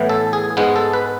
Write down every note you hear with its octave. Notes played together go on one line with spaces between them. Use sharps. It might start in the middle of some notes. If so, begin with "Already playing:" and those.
Already playing: A2 E3 B3
A4
G#4
G#2 G#3 B3
A4
B4